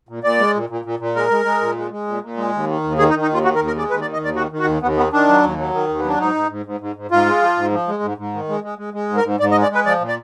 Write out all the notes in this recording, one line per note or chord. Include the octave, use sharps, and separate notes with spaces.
A#2
A#2 D5
G#3
A#2
A#2
A#2
A#2
G#3 A#4
G#3
G#3
A#2
G#3
G#3
A#2
A#2
G#3
D#2
D#3
D#2
D#3 G#4
D#4
D#3
D#4
D#2 F4
D#3 F#4
A#4
D#2
A#4
G#3 D5
D#2 B4
D5
D#3
D#5
D#2 D5
D#3 F#4
D#3
F#4
D#2
D#2 B3
D#3 B3
D#3 D4
F#3
D#2
F#3
D#3
D#2
B3
F#3 D4
G#2 D#4
G#2
G#2
G#2
G#2
G#2
G#2 F4
G#3
F3
G#2
F3
G#3
G#2
G#2
D#3
G#3
G#3
G#3
G#3
G#2
A#4
G#2
G#2 D5
D#5
G#3
D5
G#3 B4
F3 D5
A#2
D5